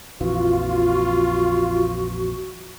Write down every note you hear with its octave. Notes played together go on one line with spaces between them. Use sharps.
A#1 F2 E3 F4 F#4